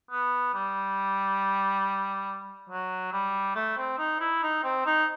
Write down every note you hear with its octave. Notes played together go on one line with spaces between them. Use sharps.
B3
G3
F#3
G3
A3
C4
D#4
E4
D#4
C4
D#4